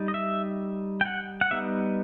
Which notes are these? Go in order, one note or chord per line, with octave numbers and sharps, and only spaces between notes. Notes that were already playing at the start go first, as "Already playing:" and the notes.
Already playing: G3 D#4
D#5
E5
G5
F#5
F#5
G3 B3 D#4 E5